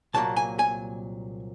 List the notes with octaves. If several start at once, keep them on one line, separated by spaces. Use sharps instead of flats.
C2 A#2 F#3 A#3 A5
G#5
G#5